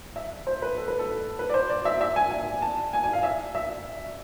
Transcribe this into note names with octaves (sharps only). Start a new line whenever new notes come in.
E5
C5
B4
A4
B4
A4
B4
D5
C5
D5
E5
E5
G#5
G#5
A5
G#5
G#5
F5
E5
E5